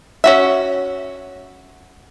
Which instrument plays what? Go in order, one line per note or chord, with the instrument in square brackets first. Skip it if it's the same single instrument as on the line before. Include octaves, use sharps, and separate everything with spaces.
[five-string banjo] C#4 F#4 E5